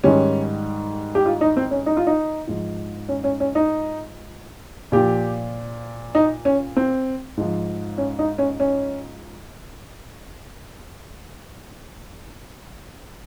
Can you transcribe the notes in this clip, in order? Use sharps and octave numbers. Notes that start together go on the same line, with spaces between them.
G#2 D#3 G3 C#4
G4
F4
D#4
C4
C#4
D#4
F4
D#4
G#2 F3
C#4
C#4
C#4
D#4
A#2 F3 G4
D#4
C#4
C4
G#2 F3
C#4
D#4
C#4
C#4